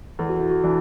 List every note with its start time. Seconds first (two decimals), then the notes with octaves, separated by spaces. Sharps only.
0.19 E2 A4
0.29 F#4
0.39 E4
0.50 F#4
0.64 E3 D4